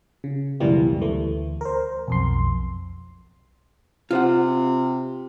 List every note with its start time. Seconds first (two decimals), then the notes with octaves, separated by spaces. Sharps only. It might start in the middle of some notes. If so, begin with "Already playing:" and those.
0.24 C#3
0.60 C#2 F#2 B2 E3 G3 A#3
1.01 D2 E3 A3
1.61 A#4 C5
2.08 B1 F2 C6
4.11 C3 F4 C5 F#5